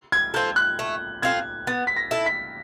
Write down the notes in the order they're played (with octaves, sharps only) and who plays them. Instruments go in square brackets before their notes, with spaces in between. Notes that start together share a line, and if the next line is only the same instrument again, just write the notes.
[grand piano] G#6
[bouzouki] C4 F4 A4 [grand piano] G6
[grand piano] F#6
[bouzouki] A3
[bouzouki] C4 F4 A4 [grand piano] G#6
[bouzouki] B3 [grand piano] A6
[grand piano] B6
A#6
[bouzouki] E4 A4
[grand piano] B6